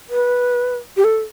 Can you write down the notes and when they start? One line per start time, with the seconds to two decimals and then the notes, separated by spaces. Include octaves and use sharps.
0.10 B4
0.97 G4
1.04 A4